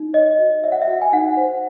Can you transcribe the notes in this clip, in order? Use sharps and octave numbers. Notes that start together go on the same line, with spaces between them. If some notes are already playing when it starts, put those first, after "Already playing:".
Already playing: D#4
C#5 D#5
F#4
C#5 E5
F#5
E5
F#4
G#5
D#4 F#5
C5